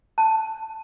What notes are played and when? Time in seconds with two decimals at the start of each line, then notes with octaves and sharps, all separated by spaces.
0.18 A5